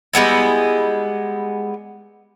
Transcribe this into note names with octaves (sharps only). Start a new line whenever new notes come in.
G3 G#3 B3 E4